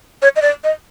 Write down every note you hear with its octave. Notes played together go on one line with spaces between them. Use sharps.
C#5
D#5
D5
D#5